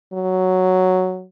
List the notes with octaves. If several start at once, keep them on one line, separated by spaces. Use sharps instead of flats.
F#3